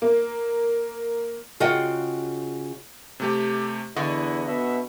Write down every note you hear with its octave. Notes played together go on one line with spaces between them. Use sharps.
A#3
C#3 F4 F#4 D#5 F#5 G5
C3 A3 G4
E2 D3 E4 D#5 F#5 C#6
B2 E5